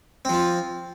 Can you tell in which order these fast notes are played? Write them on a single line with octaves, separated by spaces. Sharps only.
C4 F3 F4